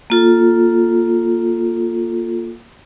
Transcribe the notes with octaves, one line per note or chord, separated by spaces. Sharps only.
A#3 F4 A4